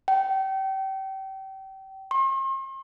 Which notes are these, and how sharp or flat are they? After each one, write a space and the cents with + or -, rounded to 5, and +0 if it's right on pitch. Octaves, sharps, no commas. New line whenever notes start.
G5 -30
C6 +45